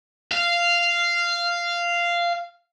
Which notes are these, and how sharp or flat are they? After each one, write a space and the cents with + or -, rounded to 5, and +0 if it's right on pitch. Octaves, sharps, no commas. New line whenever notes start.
F5 -10